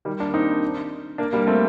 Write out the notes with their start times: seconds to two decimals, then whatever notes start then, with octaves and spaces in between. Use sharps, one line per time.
0.05 D#3 G3
0.20 A#3 D4
0.34 C4 D#4
1.18 A#3 D4
1.33 G3 A#3
1.47 A3 C4